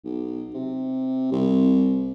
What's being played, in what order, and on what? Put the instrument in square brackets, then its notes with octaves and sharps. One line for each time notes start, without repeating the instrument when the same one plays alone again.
[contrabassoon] B1
C3
C2